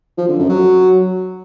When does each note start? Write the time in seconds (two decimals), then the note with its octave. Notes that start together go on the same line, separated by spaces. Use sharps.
0.18 F3
0.28 D3
0.39 F#2
0.49 F#3